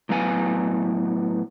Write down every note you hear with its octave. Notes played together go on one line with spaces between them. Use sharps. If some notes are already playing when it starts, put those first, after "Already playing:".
A2 F#3 B3 F5 G#5